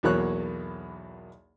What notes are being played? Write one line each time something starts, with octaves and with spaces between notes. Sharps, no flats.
B1 E2 B2 A#3 C#5 F#6